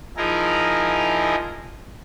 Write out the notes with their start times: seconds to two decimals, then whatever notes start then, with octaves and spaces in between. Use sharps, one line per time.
0.17 F3 D#4 E4 G#4 A#4